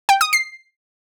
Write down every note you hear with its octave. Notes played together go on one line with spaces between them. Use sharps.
G5
D#6
C7